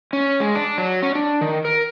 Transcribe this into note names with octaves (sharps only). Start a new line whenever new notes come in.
C#4
G#3
D4
F#3
C#4
D4
D#3
A#4